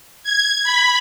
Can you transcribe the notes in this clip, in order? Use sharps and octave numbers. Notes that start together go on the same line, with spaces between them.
G#6
B5